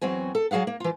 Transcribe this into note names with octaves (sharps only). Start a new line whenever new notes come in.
E2 F#3 C4 F#4 G#5
A4
F#3 F#4 G#4 F5 F#5
A#3
E3 F4